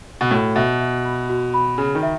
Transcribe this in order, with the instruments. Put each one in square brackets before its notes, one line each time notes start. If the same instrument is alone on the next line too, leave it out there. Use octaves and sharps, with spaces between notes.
[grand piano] B2
[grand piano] A2 [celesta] F#4
[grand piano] B2 [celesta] E5
[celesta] E5
B5
F#4
B5
[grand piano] C#3 [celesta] F#4
[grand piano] D#3
[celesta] E5